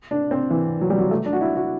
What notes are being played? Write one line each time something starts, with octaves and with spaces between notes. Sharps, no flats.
D4
C4
E3
F#3
G3
F#3
A3
D4
F#4
E4
F#4